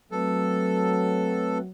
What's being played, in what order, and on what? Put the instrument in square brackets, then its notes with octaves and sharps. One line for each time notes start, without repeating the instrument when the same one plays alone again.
[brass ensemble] F#3 [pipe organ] A3 C4 B4 [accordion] A4